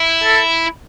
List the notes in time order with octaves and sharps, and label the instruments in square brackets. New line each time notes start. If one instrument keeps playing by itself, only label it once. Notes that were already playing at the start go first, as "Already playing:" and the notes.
Already playing: [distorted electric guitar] E4
[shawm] A4